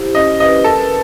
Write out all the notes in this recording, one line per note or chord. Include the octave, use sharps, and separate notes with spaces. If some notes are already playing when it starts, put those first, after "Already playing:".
Already playing: E4 G4 C5
C#4 D#5
B4 D#5
A4 A#4